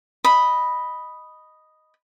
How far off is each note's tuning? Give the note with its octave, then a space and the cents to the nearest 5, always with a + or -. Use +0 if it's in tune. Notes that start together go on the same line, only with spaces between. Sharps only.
D#5 +0 B5 +0 D#6 +0